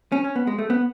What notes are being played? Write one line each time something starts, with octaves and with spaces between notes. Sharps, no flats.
C#4
C#4
B3
G#3
A3
B3